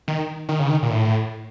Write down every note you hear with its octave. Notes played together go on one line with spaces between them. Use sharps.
D#3
D#3
C#3
D#3
A#2
A2